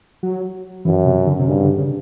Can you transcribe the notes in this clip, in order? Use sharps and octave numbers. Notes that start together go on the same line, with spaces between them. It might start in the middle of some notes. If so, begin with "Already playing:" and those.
F#3
F#2 E3
C3
D3
C3
G2 C#3
D3
C#3